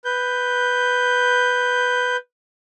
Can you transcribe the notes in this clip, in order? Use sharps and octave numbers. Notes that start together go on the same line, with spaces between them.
B4 G6